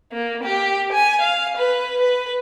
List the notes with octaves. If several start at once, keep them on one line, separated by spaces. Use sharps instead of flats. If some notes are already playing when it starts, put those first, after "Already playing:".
A#3
G4
G#5
F5
B4
B4